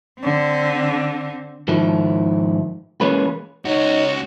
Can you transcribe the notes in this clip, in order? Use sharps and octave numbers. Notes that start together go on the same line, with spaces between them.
D3 C4
G#2 D#3 F3 E4
E3 G#3 A#3 C#4 B4
C#2 D#4 F#4 C#5